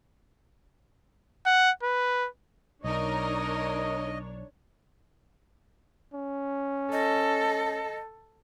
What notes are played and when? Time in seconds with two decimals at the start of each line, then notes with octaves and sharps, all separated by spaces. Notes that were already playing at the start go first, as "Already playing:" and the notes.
1.46 F#5
1.83 B4
2.84 B1 D4 D#4 A#4 C#5 D#5
6.13 C#4
6.92 A4 D#5